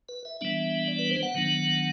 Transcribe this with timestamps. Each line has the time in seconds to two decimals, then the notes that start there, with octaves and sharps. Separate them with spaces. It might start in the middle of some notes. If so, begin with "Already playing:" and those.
0.09 B4
0.25 E5
0.41 E3 G3 B3 D4 E5
0.88 D5
0.99 B4
1.11 C5
1.23 F#5
1.35 D#3 F#3 B3 D4